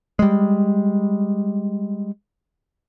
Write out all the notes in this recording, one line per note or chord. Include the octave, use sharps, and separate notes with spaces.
G3 G#3